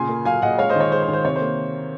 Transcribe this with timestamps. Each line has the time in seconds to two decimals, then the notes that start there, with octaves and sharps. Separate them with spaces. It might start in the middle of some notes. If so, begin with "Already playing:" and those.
Already playing: A#2 C#3 G#5 C6
0.09 A#3
0.25 F#3 F5 G#5
0.42 A#2 D#5 F#5
0.59 G#3 C#5 F5
0.69 C5 D#5
0.75 D#3 C#5
0.92 G#3 C5
1.02 C5
1.08 D#3
1.13 C5
1.25 C3 C#5
1.36 C5
1.41 A#3